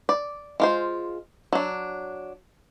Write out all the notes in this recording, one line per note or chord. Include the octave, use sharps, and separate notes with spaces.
D5
G#3 F4 C5
F#3 D4